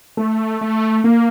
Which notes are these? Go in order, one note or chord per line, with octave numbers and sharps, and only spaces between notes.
A3
A3
A#3